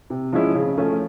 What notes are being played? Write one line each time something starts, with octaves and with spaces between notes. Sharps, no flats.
C3
F3 G#3 C#4 E4
C#3
F3 A3 C#4 F4